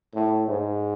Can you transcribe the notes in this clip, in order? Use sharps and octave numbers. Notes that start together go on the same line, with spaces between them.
A2
G#2